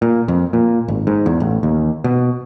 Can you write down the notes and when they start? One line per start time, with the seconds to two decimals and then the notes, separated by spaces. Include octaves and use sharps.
0.02 A#2
0.28 F2
0.53 A#2
0.88 G#1
1.07 G#2
1.26 E2
1.40 A1
1.63 D#2
2.04 B2